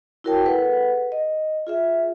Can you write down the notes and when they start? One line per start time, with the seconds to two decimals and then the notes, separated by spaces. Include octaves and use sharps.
0.24 E4 F#4 A#4 C#5 G5 A5
0.43 G#4 A4 B4 F#5
1.12 D#5
1.67 F4 G#4 E5